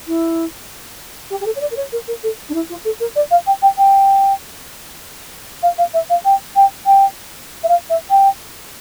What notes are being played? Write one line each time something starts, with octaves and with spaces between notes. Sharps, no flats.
E4
G4
G4
A4
C#5
D5
A#4
C#5
A#4
A#4
A4
D4
E4
F4
A4
A#4
D5
F5
G5
G5
G5
F5
F5
E5
F5
G5
G5
G5
E5
F5
E5
G5